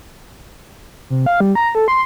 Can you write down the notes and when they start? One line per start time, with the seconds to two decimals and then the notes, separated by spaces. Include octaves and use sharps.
1.10 C3
1.26 F5
1.40 G3
1.55 A#5
1.75 A4
1.88 C6